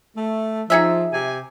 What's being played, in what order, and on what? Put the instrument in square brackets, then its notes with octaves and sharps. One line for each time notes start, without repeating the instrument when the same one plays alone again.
[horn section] A3
[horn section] F3 [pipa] D#4 G#4 E5
[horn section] C3 G#5